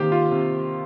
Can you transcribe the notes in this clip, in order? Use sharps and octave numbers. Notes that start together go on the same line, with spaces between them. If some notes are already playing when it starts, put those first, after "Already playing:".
Already playing: C3 D#3 A#3 G4 C5
F4
C3